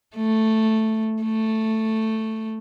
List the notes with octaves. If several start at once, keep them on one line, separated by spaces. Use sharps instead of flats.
A3
A3